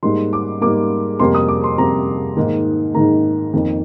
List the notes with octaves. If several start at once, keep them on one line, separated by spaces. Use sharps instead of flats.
G#2 G3 A#3 C6
D6
G#2 G3 A#3 D6
F2 C3 G3 A#3 C6
D#6
D6
C6
F2 C3 G3 A#3 A#5
G#2 D#3 A#3
G#2 D#3 A#3 A#5
F2 D#3 A#3